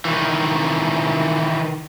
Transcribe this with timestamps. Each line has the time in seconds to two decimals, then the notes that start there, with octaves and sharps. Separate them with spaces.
0.05 D#3 E3